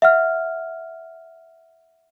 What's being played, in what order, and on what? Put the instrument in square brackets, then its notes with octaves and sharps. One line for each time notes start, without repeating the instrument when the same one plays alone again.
[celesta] E5 F#5 F6